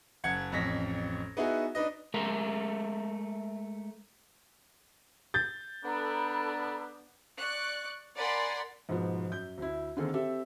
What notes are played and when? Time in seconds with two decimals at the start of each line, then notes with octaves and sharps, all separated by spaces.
0.24 F#1 F#5 G#6 C#7
0.52 A1 F2 A#6 B6
1.37 B3 D#4 E4 F#4 G#4
1.75 D4 D#4 B4 D#5
2.14 G#3 A3 A#4 E5
5.34 G6 A6
5.83 B3 D4 A4 A#5 B5
7.38 D5 C#6 F#6
8.15 A#4 D5 F#5 G#5 B5 C6
8.89 G#2 B2 F3 B3
9.29 F#2 G6
9.58 D2 E4
9.96 D3 D#3 A#3 C4 G#4 A4
10.14 C4 G4 A4 E5